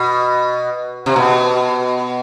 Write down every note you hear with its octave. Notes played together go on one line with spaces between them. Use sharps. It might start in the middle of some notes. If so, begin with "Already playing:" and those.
Already playing: B2
C3
B2